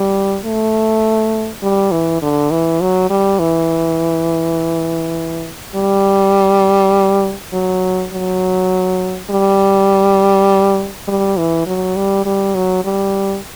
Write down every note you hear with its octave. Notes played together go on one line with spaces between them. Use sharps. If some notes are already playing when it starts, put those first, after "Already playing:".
Already playing: G3
A3
G3
E3
D3
E3
F#3
G3
E3
G3
F#3
F#3
G3
G3
E3
F#3
G3
G3
F#3
G3